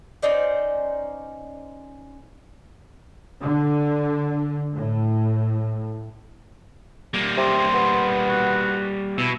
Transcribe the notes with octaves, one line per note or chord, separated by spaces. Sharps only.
C#4 D#4 C5 D5
D3
A2
G3 A#3
C3 C6
B3
F#4
B2 E4